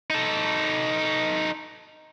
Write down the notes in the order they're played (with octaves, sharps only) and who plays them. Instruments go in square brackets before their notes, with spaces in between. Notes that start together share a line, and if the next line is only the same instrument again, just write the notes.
[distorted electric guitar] D#4 A4